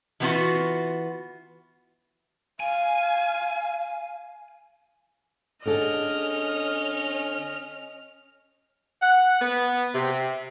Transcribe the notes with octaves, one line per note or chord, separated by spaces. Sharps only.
E3 G#3 A#3 B3 F4 F#4
F5 G#5
D3 C#4 G#4 A4 D#5 F6
F#5
B3
C3